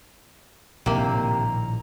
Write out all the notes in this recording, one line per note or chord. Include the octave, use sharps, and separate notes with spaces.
A#1 A2 C3 D#3 A#3 A#5